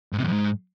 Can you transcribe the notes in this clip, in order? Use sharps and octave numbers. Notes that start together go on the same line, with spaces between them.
G#2
C3
E2
F2
G#2